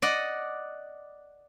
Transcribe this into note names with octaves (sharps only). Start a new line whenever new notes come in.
D5 D#5 F#5